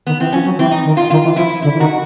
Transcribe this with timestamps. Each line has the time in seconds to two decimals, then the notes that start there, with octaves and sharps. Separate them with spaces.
0.06 D#3 B3
0.19 E3 C4
0.33 F3 C#4
0.45 F#3
0.58 E3 C4
0.71 D#4
0.84 D#3
0.97 F4
1.10 D#3 F4
1.24 E3
1.36 F3 E4
1.62 D3 E4
1.75 E3
1.79 D#3 F#4